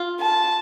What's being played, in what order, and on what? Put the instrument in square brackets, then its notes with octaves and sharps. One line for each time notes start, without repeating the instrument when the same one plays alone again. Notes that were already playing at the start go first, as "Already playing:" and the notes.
Already playing: [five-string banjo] F4
[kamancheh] A5